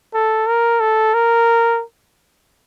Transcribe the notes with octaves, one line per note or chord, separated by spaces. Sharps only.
A4
A#4
A4
A#4